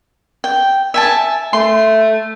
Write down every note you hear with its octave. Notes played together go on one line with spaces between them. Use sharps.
G5
E5 G#5 A5
A3 C6